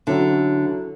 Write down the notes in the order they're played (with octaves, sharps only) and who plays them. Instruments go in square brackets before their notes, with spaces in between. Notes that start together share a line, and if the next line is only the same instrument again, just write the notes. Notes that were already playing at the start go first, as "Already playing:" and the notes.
[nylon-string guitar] D3 [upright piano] F#3 C#4 E4